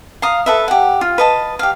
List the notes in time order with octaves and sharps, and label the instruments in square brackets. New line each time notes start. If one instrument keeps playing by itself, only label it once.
[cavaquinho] F5 A#5 D#6
A4 B4 E5
G4 F#5
F4
B4 D#5 A5
G4 F5